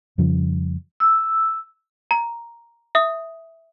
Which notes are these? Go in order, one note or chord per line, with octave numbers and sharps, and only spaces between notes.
F2 C#3 F3 G3
E6
A#5
E5 D#6